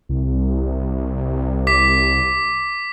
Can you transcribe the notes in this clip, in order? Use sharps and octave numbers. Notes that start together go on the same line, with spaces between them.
C2
D6 B6